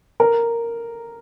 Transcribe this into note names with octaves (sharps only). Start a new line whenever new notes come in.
A#4